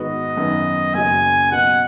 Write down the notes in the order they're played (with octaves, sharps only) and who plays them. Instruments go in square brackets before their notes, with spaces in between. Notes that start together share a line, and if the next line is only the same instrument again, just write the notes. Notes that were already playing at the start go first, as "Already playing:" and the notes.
Already playing: [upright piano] G#2 D#3 B3 F#4 [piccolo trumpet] D#5
[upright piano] F#2 D#3 B3
[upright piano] F#1 F#2 F#3 [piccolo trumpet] G#5
[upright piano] B2 F#3 B3 [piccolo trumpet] F#5